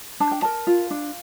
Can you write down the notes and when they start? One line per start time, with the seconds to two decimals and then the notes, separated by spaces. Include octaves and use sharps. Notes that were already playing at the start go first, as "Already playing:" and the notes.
0.20 D4 A5
0.31 G5
0.42 A#4 A5
0.67 F4
0.91 D4